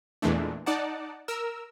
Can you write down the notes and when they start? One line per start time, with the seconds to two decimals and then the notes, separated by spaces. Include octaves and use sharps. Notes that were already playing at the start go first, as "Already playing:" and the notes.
0.22 E2 A#2 E3 G#3 A3 D4
0.66 D#4 D5 F#5 A5
1.28 A#4 E6